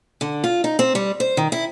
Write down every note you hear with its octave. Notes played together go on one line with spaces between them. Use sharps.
D3
F4
D#4
C4
G3
C5
D#3
E4